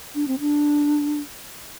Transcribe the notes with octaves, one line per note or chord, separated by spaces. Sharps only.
D4
C4
D4